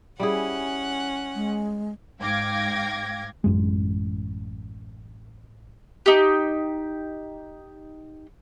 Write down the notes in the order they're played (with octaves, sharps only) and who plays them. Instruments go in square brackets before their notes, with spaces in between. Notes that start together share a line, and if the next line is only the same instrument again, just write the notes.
[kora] G3 E4 G#4 [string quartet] C#4 F#5
[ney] G#3
[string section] G#2 F5 G5 D6 G#6 A#6
[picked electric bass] A1 F#2 G#3
[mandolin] D#4 G4